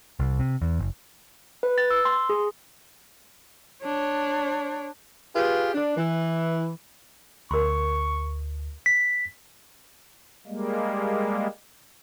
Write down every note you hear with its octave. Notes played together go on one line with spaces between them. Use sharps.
C2
C3
E2
F#1
B4
A6
E6
C6
G#4
D4 C#5
F4 G4 G#4 B4
D4
E3
D2 A#4 C6 C#6
B6
G3 G#3 A#3